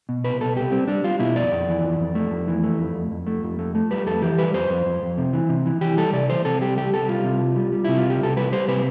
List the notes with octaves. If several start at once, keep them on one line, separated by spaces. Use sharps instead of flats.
B2
C2 B4
B2 A4
C2 G4
G3 C4
G3 D4
G3 F4
B2 E4
F2 D5
F2
E3
F2
F2
A3
F2
E3
A3
F2
F2
F2
A3
F2
A3
A3
G3 B4
F2 A4
E3 G4
G3 B4
F2 C5
F2
F2
F2
C3
E3
C3
E3
E3 G4
G3 A4
C3 D5
E3 C5
C3 A4
G3 G4
C2 G4
C2 A4
G3 F4
C3
C2
G3
G3
C3 E4
F4
C2
G4
C2 A4
G3 B4
G3 C5
C3 B4